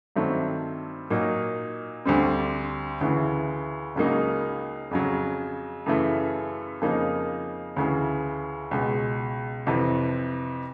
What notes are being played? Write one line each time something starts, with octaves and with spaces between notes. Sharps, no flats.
G2 D#3 F#3 A3 C4
A#2 F#3 A#3 D#4
D2 D3 G3 C4
D2 C#3 E3
C#2 C#3 F#3 A#3 D#4
F2 C#3 F#3
F#2 C#3 E3 A3
F2 C#3 F3 A#3 D#4
D2 C#3 E3
C#2 B2 G#3
F2 C3 E3